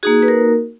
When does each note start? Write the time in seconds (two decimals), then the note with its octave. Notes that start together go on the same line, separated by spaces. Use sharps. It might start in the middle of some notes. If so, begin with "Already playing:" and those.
0.03 A#3 D#4 F#4 G#4
0.23 B4
0.28 A#4